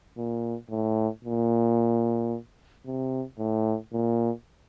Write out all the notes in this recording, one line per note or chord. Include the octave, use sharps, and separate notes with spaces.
A#2
A2
A#2
C3
A2
A#2